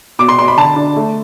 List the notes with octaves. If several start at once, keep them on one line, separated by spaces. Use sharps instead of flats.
B2 D6
C6
B2 C6
B5
D3 A5
D4
A3